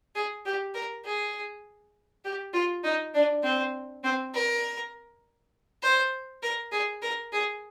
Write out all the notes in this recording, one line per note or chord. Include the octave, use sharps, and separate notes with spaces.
G#4
G4
A#4
G#4
G4
F4
D#4
D4
C4
C4
A#4
C5
A#4
G#4
A#4
G#4